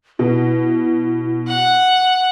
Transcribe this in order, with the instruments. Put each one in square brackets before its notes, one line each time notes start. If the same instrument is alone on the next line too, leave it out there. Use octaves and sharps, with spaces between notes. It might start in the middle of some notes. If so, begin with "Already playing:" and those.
[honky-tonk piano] B2 [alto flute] E4
[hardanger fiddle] F#5